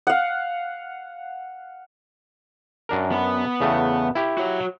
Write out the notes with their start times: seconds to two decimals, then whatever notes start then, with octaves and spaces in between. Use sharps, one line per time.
0.07 F5 F#5
2.89 F#2 D4 A#4
3.12 B3 B5
3.60 E2 C#3 A3
4.15 E4 G4
4.38 F#4 C#5